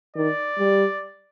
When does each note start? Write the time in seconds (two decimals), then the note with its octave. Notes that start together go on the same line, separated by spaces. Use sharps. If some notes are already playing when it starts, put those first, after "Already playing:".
0.16 D#3 D5
0.59 G3